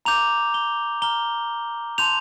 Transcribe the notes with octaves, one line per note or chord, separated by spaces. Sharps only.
A#5 D6 G6 F7
G7
A#5 F6 G7
A5 C6 G6 F7